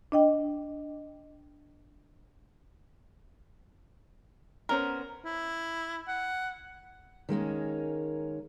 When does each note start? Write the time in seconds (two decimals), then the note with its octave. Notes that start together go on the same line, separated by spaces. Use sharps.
0.12 D4 D#5 G5
4.69 B3 C#4 A#4 C5
5.25 E4
6.08 F#5
7.29 D#3 G#3 A#3 C#4